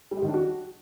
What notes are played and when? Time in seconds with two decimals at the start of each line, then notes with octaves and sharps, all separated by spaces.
0.11 G3
0.17 G#3
0.23 D#3
0.28 D4
0.34 F#4